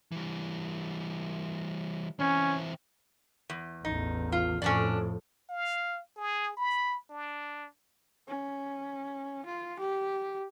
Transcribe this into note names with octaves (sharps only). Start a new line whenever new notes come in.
E3 G3
E3 C4 C#4
E2
A1 E2 D#4
F4
F2 A2 C#4 D4 D5
F5
G#4
B5
D4
C#4
F4
G4